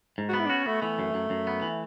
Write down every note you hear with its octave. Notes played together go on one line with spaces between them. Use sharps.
G#2
B3 F#4
E4
D4
C#4 F#4
A3 B3
E3 A3
F#2
F#2
F#2
B3
E3